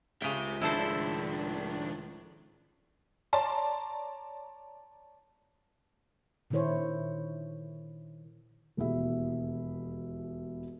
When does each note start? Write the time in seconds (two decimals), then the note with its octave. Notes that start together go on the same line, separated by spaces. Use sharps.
0.22 C#2 C#3 G4 E5 G5
0.61 A2 D#3 F3 D4 E4 G#4 A4 C5
3.33 C#5 D5 A5 A#5 C6
6.50 A#2 D3 D#3 E4 C5 C#5
8.77 E1 D#2 B2 E4 G#4 E5